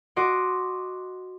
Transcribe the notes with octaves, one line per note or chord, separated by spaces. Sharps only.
F#4 D#5 C6 D6